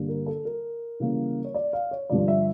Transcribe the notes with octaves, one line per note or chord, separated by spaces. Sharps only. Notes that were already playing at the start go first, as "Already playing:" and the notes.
Already playing: G2 D3 G3 A#3
A#4
A4
A#4
C#3 E3 G3 A#3
C#5
D5
F5
C#5
G2 D3 F3 D5
E5